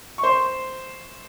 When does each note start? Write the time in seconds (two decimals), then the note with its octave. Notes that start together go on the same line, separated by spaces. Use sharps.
0.18 C#6
0.23 C5 C6